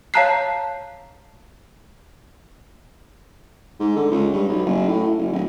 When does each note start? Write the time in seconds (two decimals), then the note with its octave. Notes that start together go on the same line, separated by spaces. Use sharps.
0.14 C#5 F5 A5 A#5 F#6 C7
3.80 G#2
3.96 D3
4.11 C#2
4.34 G2
4.49 B1
4.66 F#1
4.88 A2
5.17 F#1
5.33 D1